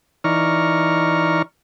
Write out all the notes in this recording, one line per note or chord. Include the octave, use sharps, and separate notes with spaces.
E3 D#4 D5 A#5 C#6 F6